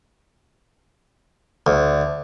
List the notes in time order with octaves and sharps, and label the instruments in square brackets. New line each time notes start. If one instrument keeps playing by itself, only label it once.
[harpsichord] D2